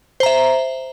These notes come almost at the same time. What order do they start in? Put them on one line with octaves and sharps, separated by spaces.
C5 A#5 E5